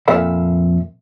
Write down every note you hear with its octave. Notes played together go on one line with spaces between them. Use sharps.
F2 A#2 A4 E5 F5 B5